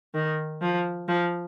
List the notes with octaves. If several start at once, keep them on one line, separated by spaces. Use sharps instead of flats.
D#3
F3
F3